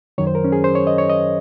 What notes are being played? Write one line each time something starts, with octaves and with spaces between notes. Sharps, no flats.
F#2 D#3 F#3 C#5
C5
A#4
C#4
G#4
C5
C#5
D#5
C#5
D#5